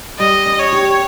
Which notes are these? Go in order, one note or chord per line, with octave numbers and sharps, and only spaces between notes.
G3 D#5
C#4
C#5
G4